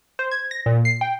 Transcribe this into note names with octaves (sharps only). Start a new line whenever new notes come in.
C5
G#6
A#6
A#2
C7
G5